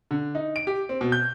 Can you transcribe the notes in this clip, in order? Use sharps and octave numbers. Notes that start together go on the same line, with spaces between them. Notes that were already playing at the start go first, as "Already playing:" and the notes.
D3
D#4
D7
G4
C4
B2
G6